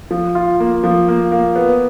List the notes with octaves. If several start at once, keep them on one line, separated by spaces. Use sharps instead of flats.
F3
F4
A#3
F3
A#3
A#3
B3